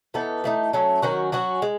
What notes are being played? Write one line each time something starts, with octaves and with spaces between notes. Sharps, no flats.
E3 B3 D#4 A4
E3 A3 D#4
F#3 A3 C#4
D#3 F#3 C#4 F#4
F#3 C#4 F#4
G#3